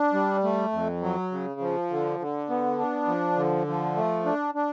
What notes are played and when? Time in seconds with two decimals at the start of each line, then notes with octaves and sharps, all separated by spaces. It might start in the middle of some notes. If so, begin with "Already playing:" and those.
Already playing: D4
0.13 G3
0.44 A3
0.72 F2
1.02 F#3
1.32 C#3
1.60 F3
1.90 D3
2.20 D3
2.50 B3
2.79 D4
3.07 F3
3.37 D3
3.67 F3
3.96 A3
4.25 D4
4.55 D4